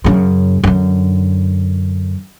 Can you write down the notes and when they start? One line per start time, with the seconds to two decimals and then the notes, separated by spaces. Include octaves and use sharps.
0.04 F#2 C#3
0.64 F#2 D3